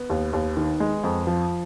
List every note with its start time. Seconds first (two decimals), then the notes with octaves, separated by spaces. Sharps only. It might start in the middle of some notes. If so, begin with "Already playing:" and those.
Already playing: B3
0.10 D#2
0.33 D#2
0.57 D#3
0.80 G#3
1.04 F2
1.27 F3